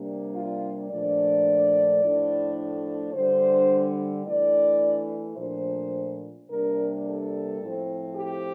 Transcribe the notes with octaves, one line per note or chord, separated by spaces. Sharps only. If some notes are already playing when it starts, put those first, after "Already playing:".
Already playing: C3 G3 A#3 D4
F4
A#2 F3 A3 D4 D5
A2 F3 A3 D4
D3 G3 D4 C5
E3 A3 D4 D5
A#2 F3 A3 D4 C5
C3 G3 A#3 D4 A#4
A4
A2 F3 C4
G4